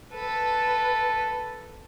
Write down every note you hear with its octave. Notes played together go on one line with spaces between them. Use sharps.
A4 B4